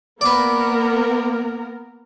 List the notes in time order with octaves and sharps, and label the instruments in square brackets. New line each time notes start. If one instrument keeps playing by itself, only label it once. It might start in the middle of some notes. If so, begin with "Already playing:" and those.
[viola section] A#3 B3 A#4 [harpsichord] B4 D5